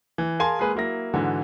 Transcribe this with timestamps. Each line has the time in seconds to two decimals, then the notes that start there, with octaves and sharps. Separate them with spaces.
0.18 E3
0.39 G#4 A#4 F5 G#5 A5 C6
0.59 G#3 A#3 G#4 B4
0.75 F#3 A#3 E4 A#6
1.14 G#2 D3 E3 F#3